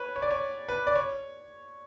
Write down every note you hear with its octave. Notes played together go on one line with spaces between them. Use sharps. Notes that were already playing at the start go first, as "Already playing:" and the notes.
Already playing: B4 C#5
C#5
D5
C#5
B4
D5
C#5